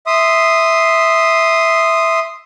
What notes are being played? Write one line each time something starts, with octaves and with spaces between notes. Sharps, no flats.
E5 C6 D#6